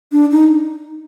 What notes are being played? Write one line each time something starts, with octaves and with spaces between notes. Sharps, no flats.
D4
D#4